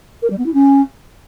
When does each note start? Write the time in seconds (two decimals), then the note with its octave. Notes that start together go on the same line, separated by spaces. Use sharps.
0.22 A#4
0.30 G3
0.38 B3
0.46 E4
0.54 C#4